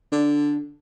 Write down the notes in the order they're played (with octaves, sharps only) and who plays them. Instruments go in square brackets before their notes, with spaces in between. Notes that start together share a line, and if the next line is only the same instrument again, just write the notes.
[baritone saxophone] D3 [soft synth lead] D4